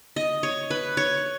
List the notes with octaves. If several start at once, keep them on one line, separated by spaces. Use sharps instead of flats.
D#5
C#5
B4
C#5